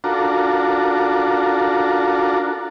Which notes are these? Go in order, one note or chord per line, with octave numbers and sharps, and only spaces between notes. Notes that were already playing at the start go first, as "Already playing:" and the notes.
D4 F4 F#4 A4 A#4